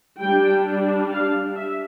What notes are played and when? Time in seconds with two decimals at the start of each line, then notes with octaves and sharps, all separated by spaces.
0.21 G3 D4 G5
1.12 F5
1.56 E5